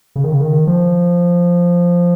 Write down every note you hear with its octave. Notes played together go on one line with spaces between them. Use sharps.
C#3
D#3
C#3
D#3
F3